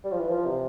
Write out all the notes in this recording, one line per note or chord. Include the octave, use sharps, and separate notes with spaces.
G3
F3
E3
F3
C3